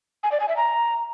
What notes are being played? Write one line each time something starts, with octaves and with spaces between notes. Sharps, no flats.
G#5
D5
G#5
E5
A#5